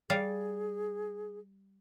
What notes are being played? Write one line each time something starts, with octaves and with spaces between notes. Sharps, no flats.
G3 G#4 F5